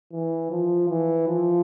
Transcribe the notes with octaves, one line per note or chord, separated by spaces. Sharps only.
E3
F3
E3
F3